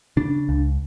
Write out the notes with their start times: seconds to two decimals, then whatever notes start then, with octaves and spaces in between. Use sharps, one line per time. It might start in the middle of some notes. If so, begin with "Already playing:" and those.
0.17 C#3 D4
0.49 C#2